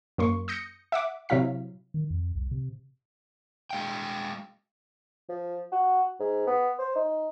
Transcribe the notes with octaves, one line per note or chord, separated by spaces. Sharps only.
F#2 A#3 C6 C#6
D#6 G6 A#6 C#7
E5 F#5 D6
C3 F#3 E4 F5 B6
D#3
F2
C2
C3
G#3 F5 G5
F3
F#4
G#2
B3
C5
D#4